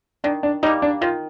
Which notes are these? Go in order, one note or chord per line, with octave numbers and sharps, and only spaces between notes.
D#3 D4
D4
G3 A#3 D#4
D4
D#3 F4